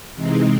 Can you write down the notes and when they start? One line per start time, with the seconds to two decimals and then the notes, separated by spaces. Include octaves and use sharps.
0.14 C3 E3 G#3 C4 D#4